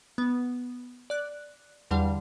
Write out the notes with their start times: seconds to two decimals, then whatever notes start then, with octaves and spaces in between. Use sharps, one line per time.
0.18 B3
1.10 D5 F#6
1.91 E2 D3 G3 F5